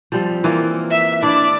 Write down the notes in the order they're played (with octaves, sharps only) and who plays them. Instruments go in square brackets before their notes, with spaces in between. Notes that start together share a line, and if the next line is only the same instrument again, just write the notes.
[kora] F3 G3 C4
E3 A#3 F4
[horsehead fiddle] E5
[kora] D4 E4 [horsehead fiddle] D5